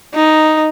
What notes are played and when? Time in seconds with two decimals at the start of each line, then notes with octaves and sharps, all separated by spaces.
0.15 D#4